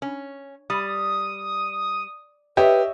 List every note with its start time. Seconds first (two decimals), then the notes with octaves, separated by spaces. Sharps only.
0.02 C#4
0.70 G3 D#6
2.57 G4 B4 C#5 D#5 E5